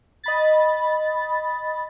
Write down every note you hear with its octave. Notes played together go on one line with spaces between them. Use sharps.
D#5 B5 A6